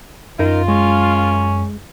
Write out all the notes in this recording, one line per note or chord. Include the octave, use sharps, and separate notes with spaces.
F#2 D#4 F4 A#4
G#3 C#4